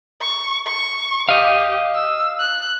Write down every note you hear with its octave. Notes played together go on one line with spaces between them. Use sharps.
C#6
C#6
G4 D#5 F5
E6
F#6